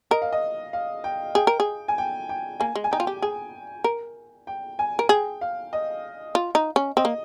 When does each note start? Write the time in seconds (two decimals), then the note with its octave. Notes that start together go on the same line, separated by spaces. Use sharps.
0.11 A#4 D#5
0.22 F5
0.32 D#5
0.73 F5
1.04 G5
1.35 G#4 G5
1.47 A#4
1.60 G#4
1.88 G#5
1.98 G5
2.29 G5
2.60 A#3 G#5
2.75 G#3
2.84 G#5
2.91 D#4 G5
3.00 F4
3.07 G4
3.22 G#4 G#5
3.84 A#4
4.47 G5
4.79 G#5
4.99 A#4
5.09 G#4 G5
5.41 F5
5.73 D#5
6.35 F4
6.55 D#4
6.76 C#4
6.97 C4 D#5
7.05 A#3